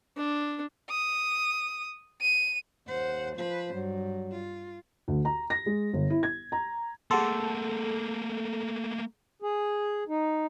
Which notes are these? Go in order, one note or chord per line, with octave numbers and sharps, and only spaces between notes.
D4
D#6
D#7
D#2 C5 F#5
F3 B4 C5
G2 F#3
F4
D2
A#5
A#6
G#3
G1
E4
G#6
A#5
A3 A#3 G#4 A4 F#5 C6
G#4
D#4